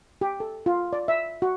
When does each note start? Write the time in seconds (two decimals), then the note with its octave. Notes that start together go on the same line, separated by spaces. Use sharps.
0.21 G4
0.40 A4
0.66 F4
0.93 D5
1.08 E5
1.42 F#4